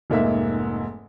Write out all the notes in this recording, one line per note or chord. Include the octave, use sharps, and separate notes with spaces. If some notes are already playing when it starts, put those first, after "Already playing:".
F1 G#2 A#3 E5